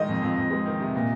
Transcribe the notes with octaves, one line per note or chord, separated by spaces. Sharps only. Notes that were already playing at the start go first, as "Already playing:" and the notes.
Already playing: D#3 G#3 D#5
F2
F2
F2
G#3
D#3
C3
A#2